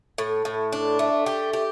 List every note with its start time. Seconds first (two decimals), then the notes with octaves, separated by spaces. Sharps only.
0.18 A2
0.45 A2
0.73 D4
0.99 A3
1.26 G4
1.53 G4